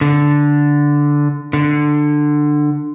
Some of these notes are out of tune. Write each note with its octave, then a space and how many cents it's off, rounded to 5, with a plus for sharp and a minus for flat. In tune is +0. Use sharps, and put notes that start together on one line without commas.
D3 -5
D3 +15